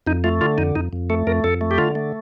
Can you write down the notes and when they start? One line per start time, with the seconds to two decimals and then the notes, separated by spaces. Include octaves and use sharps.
0.07 F2 D#4
0.24 A3 F4
0.41 D3 F4
0.58 F2 D#4
0.75 F2 D#4
0.93 F2
1.10 A3 A4
1.27 F2 A#4
1.44 F2 A4
1.61 A3
1.71 G4
1.78 D3 F4
1.95 A3